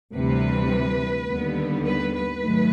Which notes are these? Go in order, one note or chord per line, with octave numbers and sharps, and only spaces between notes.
D2 C3 E3 G3 B4
D#2 D3 G3 B3
B4
B4
G#2 D#3 F#3 A3